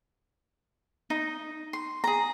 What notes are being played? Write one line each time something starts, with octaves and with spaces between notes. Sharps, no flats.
D#4
C6
G#4 A#5